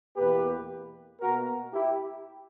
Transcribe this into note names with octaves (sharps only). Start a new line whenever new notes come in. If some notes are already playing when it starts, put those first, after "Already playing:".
E2 B2 A#3 G4 B4
B2 A#3 F#4 A#4
E4 G4